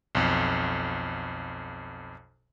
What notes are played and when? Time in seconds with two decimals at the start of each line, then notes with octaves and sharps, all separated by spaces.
0.15 B1 F2